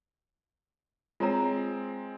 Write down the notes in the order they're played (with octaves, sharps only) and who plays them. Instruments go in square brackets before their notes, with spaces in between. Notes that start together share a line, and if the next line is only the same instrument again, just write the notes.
[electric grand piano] G#3 C4 [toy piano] F4 C#5 A#5